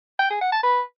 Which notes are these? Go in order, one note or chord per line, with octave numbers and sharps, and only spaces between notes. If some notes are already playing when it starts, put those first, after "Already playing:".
G5
G#4
F#5
A5
B4